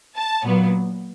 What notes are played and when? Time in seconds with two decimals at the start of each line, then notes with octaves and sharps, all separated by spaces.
0.16 A5
0.44 A#2 F#3 B3